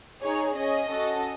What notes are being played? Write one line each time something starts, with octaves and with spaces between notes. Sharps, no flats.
D#4 G#4 C#5
C#4 G#4 D#5
C#4 F#4 A4